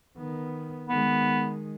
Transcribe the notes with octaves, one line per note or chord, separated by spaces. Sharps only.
D#3 B3
D#3 G#3 B3